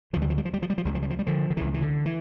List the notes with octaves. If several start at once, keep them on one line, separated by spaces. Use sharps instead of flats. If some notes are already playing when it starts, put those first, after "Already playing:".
D2 C#3 F3
G3
F3
G3
F3
G3
F3
G3
F3
C#2 C#3 G3
F3
G3
F3
G3
D3 F3
D3
C#2 C#3 E3
E3
D3
E3